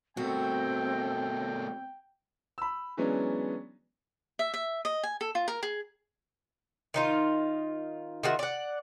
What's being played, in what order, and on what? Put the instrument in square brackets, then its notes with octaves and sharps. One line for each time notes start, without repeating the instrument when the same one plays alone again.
[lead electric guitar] B2 A3 [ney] C4 [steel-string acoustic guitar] F#4 [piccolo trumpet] G5
[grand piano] B5 E6
E3 F#3 G#3 B3 C#4 D4
[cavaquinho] E5
E5
D#5
G#5
A4
F4
A#4
G#4
[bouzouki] D#3 D#4 F4
D#3 F4 F#4 E5
D5 F#5